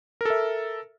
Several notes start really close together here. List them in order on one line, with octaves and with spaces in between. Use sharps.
A#4 A4 E5